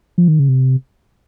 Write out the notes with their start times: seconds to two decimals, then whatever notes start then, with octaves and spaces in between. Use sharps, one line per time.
0.18 F3
0.28 D#3
0.39 C#3
0.48 C3